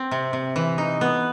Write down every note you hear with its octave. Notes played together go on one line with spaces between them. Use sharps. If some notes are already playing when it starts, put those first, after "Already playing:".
Already playing: C4
C3
C3
E3
D#4
B3